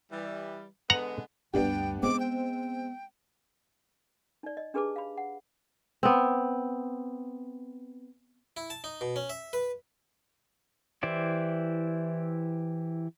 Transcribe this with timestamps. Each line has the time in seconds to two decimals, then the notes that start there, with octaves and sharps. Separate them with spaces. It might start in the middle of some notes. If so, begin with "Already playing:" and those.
0.12 E3 G3
0.90 D3 G#3 B3 F#5 A#5
1.54 D2 G2 B3 D4 G4 G5
2.03 G#3 B3 C4 F4 D6
2.20 G5
4.43 D#4 D5
4.57 D#5
4.74 D4 G4 G#4 B4 A5 D6
4.96 F5 B5
5.17 F#5
6.03 B3 C4
8.57 E4
8.70 A5
8.84 D#4
9.01 B2
9.16 C#4
9.30 E5
9.53 B4
11.03 E3 E4 G4 C5 D5